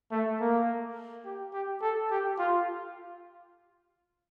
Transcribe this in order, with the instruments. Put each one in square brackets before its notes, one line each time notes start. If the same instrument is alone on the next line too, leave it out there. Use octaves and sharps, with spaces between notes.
[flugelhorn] A3
A#3
G4
G4
A4
G4
F4